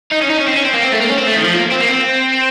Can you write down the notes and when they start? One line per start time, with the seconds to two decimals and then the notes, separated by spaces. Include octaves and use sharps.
0.12 D#4
0.22 C#4
0.30 D#4
0.39 C#4
0.48 C4
0.56 C#4
0.65 C4
0.74 A#3
0.83 C4
0.93 A3
1.01 A#3
1.10 C#4
1.18 C4
1.27 A3
1.37 D#3
1.45 F3
1.54 A#3
1.72 C4
1.81 A#3
1.89 C4